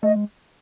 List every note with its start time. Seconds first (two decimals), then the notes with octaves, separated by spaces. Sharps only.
0.03 A3 D#5
0.16 G#3